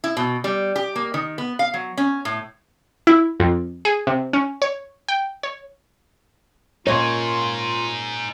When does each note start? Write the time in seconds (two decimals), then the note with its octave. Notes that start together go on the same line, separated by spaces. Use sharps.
0.04 E4
0.17 B2
0.44 G3
0.76 G4
0.96 A#3
1.14 D#3
1.38 B3
1.59 F5
1.74 F#3
1.97 C#4
2.25 A2
3.07 E4
3.40 F2
3.85 G#4
4.07 C3
4.33 C#4
4.62 C#5
5.08 G5
5.43 C#5
6.87 A#2 D#4 F4 G#4 C#5 D#5